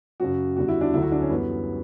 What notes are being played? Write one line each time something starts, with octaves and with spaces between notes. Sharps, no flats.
F#2 C#3 F#3 F#4
E2 D3 G3 F#4
E4
D4
D2 D3 F#3 E4
F#4
D4
C#4
F#2 E3 G3 B3